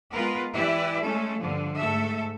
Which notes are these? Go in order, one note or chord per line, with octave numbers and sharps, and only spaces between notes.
G#3 B3 F4 A#4 B4
E3 E4 G4 B4 D5 E5
G#3 A3 C#4 A4
G2 D3 F3
G#2 A3 A4 E5